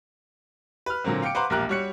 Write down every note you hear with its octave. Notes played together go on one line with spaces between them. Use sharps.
B4 F6
A#2 D3 F#3 A#3 C4
F5 G5 D6 C#7 D7
B4 C5 F5 F#5 A#5 D6
E1 A#1 A#3 G4 A#5 F#6
G3 F#4 C#5 F#6 C#7